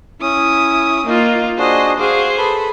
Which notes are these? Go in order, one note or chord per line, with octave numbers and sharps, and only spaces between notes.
C#4 E4 D#6
A#3 D#4 F4
D4 F#4 G#4 C5 D#5
F#4 G#4 C5 F5 D6
A4 B4 B5